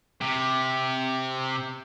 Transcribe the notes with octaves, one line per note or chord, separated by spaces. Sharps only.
C3